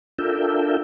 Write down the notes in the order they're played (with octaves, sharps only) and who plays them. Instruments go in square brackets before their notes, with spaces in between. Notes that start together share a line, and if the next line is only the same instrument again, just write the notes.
[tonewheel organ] D4 F4 A4 A#4 E5 G5